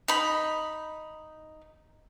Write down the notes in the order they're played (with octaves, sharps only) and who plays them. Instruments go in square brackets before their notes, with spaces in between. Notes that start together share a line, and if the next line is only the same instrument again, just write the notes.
[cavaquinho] D#4 B5